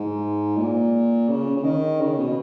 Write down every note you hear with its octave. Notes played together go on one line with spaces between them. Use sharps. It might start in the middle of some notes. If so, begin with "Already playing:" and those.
Already playing: G#2
A#2
C#3
C#3
D#3
C#3
B2